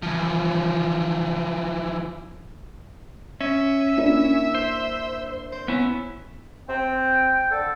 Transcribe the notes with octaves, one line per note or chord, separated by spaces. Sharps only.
E3 F3
C#4 E5
A#3 D4 E4
C5
C5
B3 C#4 E4
C4 G5
D3 A4